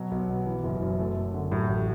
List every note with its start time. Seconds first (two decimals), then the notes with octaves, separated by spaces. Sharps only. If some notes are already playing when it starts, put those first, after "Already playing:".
Already playing: B2 F#3
0.11 B1
0.29 B2
0.46 E3
0.64 F#1
0.82 F#2
0.99 A3
1.16 F#2
1.34 D3
1.51 A2 F#3
1.68 A1